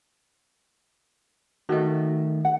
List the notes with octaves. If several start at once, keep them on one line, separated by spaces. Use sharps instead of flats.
D#3 A3 F#4 D#5
F#5